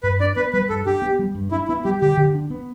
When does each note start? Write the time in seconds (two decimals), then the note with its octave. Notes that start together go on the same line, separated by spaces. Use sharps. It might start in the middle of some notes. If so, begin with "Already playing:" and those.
0.03 G2 B4
0.20 D4 D5
0.36 B3 B4
0.53 G3 B4
0.69 G2 A4
0.86 D4 G4
1.02 B3
1.19 G3
1.35 G2
1.52 D4 E4
1.68 B3 E4
1.85 G3 G4
2.01 D3 G4
2.17 D3
2.35 D4
2.50 B3